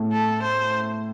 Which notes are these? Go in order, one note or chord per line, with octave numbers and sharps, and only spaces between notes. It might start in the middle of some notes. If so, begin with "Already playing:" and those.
Already playing: A2 A3
A4
C5